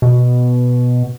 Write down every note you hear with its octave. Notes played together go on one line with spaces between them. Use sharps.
B2